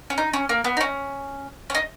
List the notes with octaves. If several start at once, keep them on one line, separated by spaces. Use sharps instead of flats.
C#4
D#4
C#4
A#3
B3
D#4
C#4
C#4
D#4